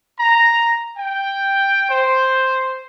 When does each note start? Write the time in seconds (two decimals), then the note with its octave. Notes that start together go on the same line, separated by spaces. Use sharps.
0.19 A#5
0.98 G5
1.89 C5